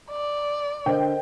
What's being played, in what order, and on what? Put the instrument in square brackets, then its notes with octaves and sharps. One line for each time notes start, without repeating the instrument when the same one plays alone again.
[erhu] D5
[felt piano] D3 [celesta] A#4 C5 D#5 [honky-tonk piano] G5